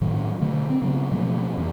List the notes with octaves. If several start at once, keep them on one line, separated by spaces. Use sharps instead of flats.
A2 D#3 F#3
B2 D3 A3
C4
C#3 F#3 B3
B2 F3 A3 A#3
F2 E3